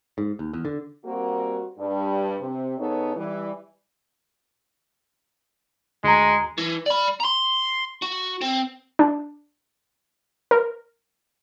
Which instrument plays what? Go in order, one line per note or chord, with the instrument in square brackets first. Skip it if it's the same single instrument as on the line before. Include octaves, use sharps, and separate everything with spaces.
[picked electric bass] G#2
D#2
E2
D3
[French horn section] G3 A#3 C4 F#4
G2
C3
C#3 B3 D#4 A4 C#5
E3 G3
[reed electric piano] D2 A#5 [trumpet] G#3
[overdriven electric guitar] E3
D5 B5
A#5 C6
F#4
C4
[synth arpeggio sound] D4
A#4